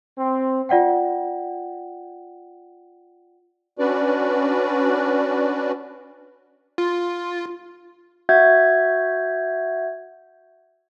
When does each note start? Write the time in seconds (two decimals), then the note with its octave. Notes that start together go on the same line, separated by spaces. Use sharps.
0.18 C4
0.69 F4 D5 F#5 G5
3.78 C#4 D4 F#4 B4 D5
6.78 F4
8.29 F#4 E5 F#5 G6 G#6